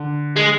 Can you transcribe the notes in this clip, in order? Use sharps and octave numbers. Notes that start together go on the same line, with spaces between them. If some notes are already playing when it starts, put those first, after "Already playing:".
Already playing: D3
G#3